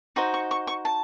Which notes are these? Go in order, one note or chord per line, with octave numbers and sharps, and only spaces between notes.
D#4 F#4 C5
C#6
C#6
C#6
A5